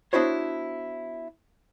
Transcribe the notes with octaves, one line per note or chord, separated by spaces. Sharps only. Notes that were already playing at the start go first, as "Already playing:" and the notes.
B3 D4 E4 F#4 C5 C#5